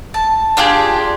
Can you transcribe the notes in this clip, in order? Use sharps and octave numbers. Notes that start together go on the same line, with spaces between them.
A5
D4 F4 G4 G#4